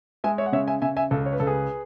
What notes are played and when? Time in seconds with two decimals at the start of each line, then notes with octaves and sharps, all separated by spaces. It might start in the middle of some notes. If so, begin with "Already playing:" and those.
0.24 G#3 E5 G#5
0.38 C#5 E5
0.46 F#5
0.52 C#3 C#5 E5
0.68 E5 G#5
0.82 C#3 E5 G#5
0.97 E5 G#5
1.11 C#2 A4
1.26 C#5
1.33 B4
1.40 C#2 A4
1.47 G#4 B4